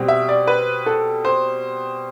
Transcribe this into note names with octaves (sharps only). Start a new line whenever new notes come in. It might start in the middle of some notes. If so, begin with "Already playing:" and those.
Already playing: B2 G3 C4
E5
D5
B4
A4
C5